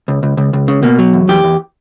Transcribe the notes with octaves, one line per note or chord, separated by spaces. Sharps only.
C#2
C#2
C#2
C#2
C#3
B2 A#3
F#3
E2
E2 G4
E2